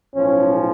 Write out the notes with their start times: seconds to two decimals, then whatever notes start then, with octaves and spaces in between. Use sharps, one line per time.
0.15 B1 A2 F3 C#4